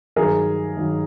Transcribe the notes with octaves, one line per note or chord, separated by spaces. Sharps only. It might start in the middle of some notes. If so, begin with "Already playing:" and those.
G2 D#3 F#3 G#4 A#4
G2 D#3 F#3